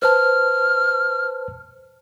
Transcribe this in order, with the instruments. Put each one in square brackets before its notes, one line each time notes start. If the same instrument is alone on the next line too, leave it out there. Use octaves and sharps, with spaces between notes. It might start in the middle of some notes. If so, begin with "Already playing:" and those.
[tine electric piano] B4 C5 A5 [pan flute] F6